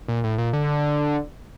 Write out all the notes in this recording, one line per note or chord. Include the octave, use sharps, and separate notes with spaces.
A#2
A2
A#2
D3